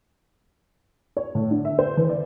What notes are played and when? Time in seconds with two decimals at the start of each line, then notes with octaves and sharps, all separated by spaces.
1.17 C#5
1.35 A2
1.51 D3
1.65 E5
1.79 C5
1.97 E3
2.09 D5